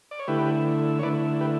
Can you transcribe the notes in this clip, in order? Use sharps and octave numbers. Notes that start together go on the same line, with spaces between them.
D5
C#5
D3 A3 E4 G4 B4
C#5
D3 A3 E4 B4 D5
G4 B4